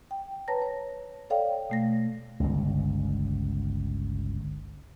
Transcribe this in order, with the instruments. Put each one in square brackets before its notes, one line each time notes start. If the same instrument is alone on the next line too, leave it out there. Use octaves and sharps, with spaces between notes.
[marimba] G5
B4 C#5 A5 A#5 A#6
C#5
A4 C#5 D5 F5 G5
B2 A3 A#6
[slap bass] G1 C#2